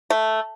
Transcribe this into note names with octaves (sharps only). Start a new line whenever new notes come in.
A3